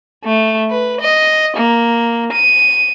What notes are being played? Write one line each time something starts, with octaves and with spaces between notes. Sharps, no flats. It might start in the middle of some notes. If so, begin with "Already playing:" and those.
A3
B4
D#5
A#3
D#7